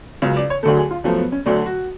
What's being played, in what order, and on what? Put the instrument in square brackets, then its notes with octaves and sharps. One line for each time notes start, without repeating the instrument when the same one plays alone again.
[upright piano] C#2 C#3 F#3
D5
C#5
D2 D3 F#3 A3 A4
G#4
F4
F#2 F3 A3 B3
B3
C#4
D2 D3 F#3 A3 D4
F#4